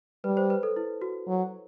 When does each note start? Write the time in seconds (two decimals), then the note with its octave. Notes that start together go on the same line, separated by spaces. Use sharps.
0.24 G3 B4
0.37 C5
0.50 B4
0.63 A4
0.76 E4
1.02 F#4
1.27 F#3